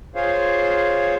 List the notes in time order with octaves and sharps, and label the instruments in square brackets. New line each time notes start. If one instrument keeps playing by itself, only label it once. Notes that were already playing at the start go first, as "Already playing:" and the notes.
[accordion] F4 G#4 C5 C#5 F5